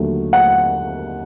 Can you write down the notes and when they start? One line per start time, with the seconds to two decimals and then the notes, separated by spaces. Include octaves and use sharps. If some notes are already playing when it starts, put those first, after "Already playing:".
Already playing: D#2 D3 F#3 A3
0.33 F#5